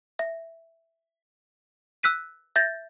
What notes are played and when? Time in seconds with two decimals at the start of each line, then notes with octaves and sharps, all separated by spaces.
0.19 E5
2.03 E6 F#6 B6 D#7
2.56 E5 G6 A6 A#6